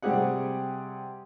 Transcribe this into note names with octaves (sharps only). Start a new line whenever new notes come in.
C3 G3 C4 G4 G#4 F#5